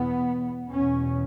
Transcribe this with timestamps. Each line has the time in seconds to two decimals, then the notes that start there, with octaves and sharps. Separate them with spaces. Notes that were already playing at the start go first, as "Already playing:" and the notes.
Already playing: E2 B2 B3
0.71 E2 B2 C#4